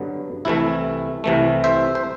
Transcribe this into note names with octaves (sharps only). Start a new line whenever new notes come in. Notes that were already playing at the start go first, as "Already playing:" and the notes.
Already playing: G2 D3 F#3 B3
C2 C3 E3 A3 E4
C2 C3 E3 A3
C5 E5
C5